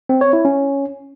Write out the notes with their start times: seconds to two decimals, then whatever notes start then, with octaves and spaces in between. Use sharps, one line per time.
0.09 C4
0.21 C#5
0.33 E4
0.45 C#4